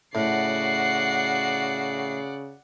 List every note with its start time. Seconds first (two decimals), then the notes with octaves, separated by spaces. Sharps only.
0.15 A2 C#3 F#4 D5 F#5 C7